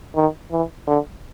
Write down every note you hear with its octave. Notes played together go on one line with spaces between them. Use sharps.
D#3
E3
D3